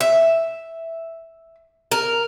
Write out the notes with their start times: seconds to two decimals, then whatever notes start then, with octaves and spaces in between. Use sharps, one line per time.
0.01 E5
1.92 A#4